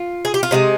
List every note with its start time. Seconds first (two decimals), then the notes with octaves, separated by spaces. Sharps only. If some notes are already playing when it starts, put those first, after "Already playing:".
Already playing: F4
0.25 G#4
0.34 G4
0.43 F4
0.51 C3 F3 G#3 D#4